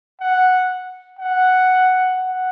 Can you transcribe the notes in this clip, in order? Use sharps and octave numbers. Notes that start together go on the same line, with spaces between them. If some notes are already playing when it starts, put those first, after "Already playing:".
F#5
F#5
F#5